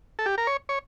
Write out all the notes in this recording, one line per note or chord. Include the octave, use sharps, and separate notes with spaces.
A4
G4
A#4
C#5
C#5